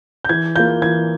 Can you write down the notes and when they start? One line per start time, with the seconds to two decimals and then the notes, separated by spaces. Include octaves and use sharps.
0.25 G6
0.29 E3 G#6
0.56 A#3 F4 G6
0.82 E3 G#6